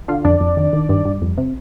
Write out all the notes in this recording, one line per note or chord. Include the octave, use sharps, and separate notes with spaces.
D3 F4 F5
F2 D4 D5
F2
D#3
D#3
G2
G2
F2
C3